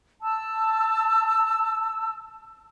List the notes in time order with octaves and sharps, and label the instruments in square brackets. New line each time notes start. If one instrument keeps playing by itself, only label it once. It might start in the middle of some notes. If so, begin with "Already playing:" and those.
[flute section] A5 E6